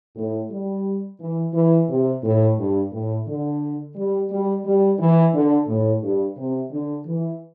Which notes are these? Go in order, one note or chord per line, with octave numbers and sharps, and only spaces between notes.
A2
G3
E3
E3
C3
A2
G2
A2
D3
G3
G3
G3
E3
D3
A2
G2
C3
D3
E3